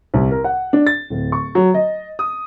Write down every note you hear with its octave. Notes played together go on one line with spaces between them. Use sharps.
C2
A#4
F#5
D4
A6
D1
C#6
F#3
D#5
D#6